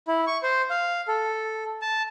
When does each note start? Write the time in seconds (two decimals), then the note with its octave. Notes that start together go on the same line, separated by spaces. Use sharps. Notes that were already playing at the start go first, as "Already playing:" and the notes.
0.08 E4
0.27 C#6
0.43 C5
0.70 F5
1.08 A4
1.82 A5